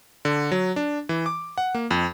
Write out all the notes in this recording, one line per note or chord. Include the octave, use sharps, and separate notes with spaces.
D3
F#3
D4
E3
D6
F#5
A#3
F2